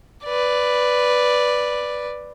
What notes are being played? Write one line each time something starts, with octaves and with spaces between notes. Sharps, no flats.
B4 D5